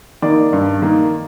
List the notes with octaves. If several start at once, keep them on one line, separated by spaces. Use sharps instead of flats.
D#3 A#3 D5
G2
D#3 A#3